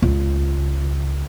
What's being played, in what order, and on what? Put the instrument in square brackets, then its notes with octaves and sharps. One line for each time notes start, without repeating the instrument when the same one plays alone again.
[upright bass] C#2